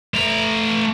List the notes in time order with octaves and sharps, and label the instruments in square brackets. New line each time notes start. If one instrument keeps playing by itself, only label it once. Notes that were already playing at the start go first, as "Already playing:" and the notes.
[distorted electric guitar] A3 A#5